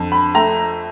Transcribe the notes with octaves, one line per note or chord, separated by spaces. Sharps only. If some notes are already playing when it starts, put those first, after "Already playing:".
Already playing: F2 D3
B5
A3 A#5